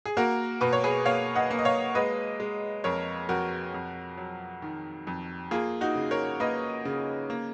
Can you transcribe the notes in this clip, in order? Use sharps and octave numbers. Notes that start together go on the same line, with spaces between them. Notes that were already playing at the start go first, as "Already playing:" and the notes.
G#4
A#3 F#4 A#4
B2 B4
C#5
G#4 B4
A#3 C#5 F5
D#5 F#5
A#3
D#5
C#5 F5
G#3 B4 D#5
G#3
F2 A#4 C#5
F2 F#4 A#4
F2
F#3
D#3
F2
A#3 F4 G#4
D#4 F#4
C#3
A#4 C#5
A#3 B4 D#5
C#3
A#3